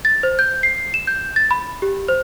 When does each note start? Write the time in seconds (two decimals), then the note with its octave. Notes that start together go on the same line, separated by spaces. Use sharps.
0.05 A6
0.23 C5
0.39 G6
0.63 C7
0.94 E7
1.07 G6
1.36 A6
1.51 B5
1.82 G4
2.08 C5